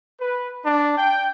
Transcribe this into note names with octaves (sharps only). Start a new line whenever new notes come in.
B4
D4
G5